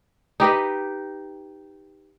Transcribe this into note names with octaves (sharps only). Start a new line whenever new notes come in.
D#4 G4 B4 D#5